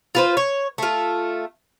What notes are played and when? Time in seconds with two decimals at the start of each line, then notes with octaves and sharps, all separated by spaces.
0.15 F4 B4 C5
0.37 C#5
0.78 A3 F4